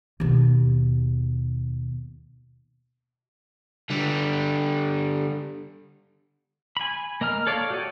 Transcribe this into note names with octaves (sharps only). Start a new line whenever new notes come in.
D#2 B2
D3 G3
G#5 B5
A#3 D#5 A#5 F6
A4 C#5 D5 F5
F#4 G4 A4 C#5 D#5